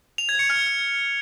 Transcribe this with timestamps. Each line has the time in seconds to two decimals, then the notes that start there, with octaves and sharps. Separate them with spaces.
0.18 F7
0.29 G#6
0.39 C#7
0.50 F6